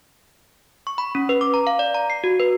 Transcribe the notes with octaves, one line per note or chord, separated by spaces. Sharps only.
C#6
B5
C#4
B4
D6
A#5
F5
D5
A#5
C7
F#4
B4